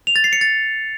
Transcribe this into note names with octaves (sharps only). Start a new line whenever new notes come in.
F7
A6
C7
C#7
A6